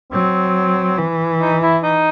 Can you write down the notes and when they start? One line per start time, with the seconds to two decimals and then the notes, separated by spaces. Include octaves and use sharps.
0.12 F#3 C4
0.98 E3
1.41 D#4
1.62 E4
1.83 D#4